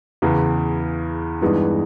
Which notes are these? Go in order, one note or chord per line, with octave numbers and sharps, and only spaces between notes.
E2 C#3 E3
G2 E3 G#3 B3 D#4